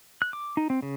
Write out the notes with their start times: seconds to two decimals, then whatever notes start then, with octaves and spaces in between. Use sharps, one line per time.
0.22 F#6
0.33 D6
0.57 D#4
0.70 C4
0.82 C#3